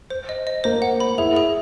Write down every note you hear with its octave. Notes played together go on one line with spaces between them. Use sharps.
C5
D#5
D#5
A#3 C5
F#5
B5
E4 G#4
G#4